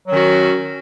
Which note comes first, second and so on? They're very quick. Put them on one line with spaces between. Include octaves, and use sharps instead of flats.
F#3 C#4 D#3 F#4